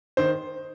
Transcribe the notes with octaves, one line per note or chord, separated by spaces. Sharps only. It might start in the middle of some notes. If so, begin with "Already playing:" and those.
D#3 C5